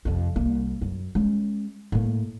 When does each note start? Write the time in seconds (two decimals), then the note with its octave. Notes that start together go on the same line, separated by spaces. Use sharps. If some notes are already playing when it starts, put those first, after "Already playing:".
0.05 F2 C3
0.36 C2 A#3
0.81 F#2
1.15 G#3 C#4
1.92 A2 A#3